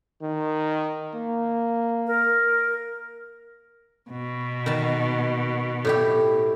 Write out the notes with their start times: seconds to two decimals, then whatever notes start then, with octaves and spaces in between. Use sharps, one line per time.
0.22 D#3
1.14 A#3
2.07 A#4
4.10 B2
4.66 D#3 A5
5.85 A2 E4 G4